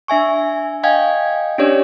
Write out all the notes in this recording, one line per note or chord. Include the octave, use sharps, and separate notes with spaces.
D4 E5 G#5 C#6
D#5 F5 G5 G#5 G#6
C#4 D4 G4 C#5 D5